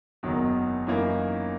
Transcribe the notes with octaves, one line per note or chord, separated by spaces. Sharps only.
F#1 E2 D#3 F#3
F#2 E3 A#3 D#4